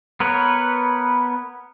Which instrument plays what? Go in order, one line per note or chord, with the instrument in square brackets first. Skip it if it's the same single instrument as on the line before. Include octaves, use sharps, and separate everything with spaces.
[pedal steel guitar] B3 A#4 B4 C#5